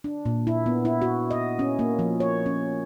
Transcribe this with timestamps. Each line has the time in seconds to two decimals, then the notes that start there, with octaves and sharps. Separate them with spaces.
0.04 D4
0.25 A#2
0.47 E4
0.66 B3
0.85 E4
1.02 F#4
1.31 D#5
1.59 C#4
1.79 A#3
1.99 F3
2.20 C#5
2.46 C#4